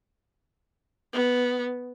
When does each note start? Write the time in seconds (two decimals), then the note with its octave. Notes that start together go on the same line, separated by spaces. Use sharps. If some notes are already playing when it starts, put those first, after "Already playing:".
1.13 B3